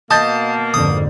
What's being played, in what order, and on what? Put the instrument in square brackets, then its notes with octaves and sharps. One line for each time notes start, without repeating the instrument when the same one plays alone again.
[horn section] B2 A#3 [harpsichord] D#5 [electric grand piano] A5 G6 A6
[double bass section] F2 G#2 D3 [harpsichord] D#6